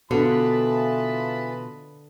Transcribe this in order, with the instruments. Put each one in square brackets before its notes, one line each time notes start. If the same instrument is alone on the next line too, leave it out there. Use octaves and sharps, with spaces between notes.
[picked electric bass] B2 [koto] D3 [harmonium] E3 F4 A5 [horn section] B4 D#5 B5